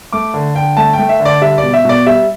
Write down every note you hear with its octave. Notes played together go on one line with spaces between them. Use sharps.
A3 D6
D3
D3 G5
A3 A5
G5
A3
E5
D3
D5
G3 E5
D5
B2
E5
B2 D5
G3 E5